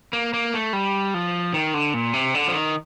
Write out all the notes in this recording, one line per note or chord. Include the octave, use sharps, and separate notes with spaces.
A#3
A#3
A3
G3
F3
D#3
D3
A#2
C3
D3
F3
D#3